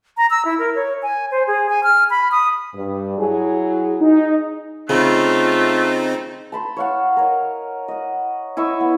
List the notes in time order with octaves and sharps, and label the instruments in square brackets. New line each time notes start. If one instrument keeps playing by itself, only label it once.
[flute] A#5
E6
E4
A#4
C#5
G#5
C5
G#4
G#5
F6
B5
D#6
[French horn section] G2
F#3 E4 G#4
[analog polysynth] D#4
[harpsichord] C#3 [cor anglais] A3 [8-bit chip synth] C4 D#4 [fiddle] F4
[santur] A5 B5 C6
C#5 F5 F#5
A#4 C#5 D#5
D#5 F#5
E4 D#5 C#6 E6
B3